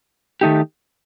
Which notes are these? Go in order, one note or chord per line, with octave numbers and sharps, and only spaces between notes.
D#3 A3 D#4 G4